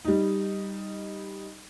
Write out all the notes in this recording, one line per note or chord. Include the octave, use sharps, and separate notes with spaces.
G3 D#4